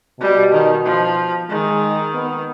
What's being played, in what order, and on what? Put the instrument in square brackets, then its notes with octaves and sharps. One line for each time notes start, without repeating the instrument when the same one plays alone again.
[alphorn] B2 [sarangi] G3
[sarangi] D#3
F3
[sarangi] D#3 [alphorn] G#3
[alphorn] B3